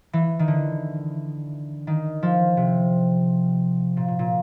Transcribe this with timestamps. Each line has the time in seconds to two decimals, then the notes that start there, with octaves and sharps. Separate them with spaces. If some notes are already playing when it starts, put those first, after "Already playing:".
0.13 E3
0.39 D#3
0.48 D3
1.87 D#3
2.23 F3
2.57 C3
3.97 A#2
4.08 A#2
4.19 A#2